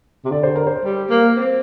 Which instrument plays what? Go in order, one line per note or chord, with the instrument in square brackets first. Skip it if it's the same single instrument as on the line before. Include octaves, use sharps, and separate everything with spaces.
[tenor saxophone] C3
[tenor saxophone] D3 [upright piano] D5
[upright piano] C5
A#4
C5
[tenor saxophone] G3
A#3
C4